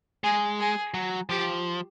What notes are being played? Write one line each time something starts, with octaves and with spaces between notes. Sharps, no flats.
G#3 G#4
G#4
F#3
F3 G4